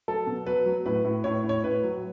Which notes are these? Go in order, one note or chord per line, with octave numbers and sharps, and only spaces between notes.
F#3 A4
B2
F#3 B4
F#3
A2 B4
A2
A2 C#5
A2
C#5
A2 B4
F#3